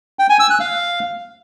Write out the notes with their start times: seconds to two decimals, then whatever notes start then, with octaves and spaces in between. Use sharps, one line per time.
0.19 G5
0.29 G#5
0.40 E6
0.50 F#6
0.60 F5